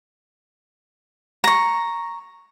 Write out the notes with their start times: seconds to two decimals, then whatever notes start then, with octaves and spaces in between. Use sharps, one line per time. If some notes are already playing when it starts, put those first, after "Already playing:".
1.44 A#5 C#6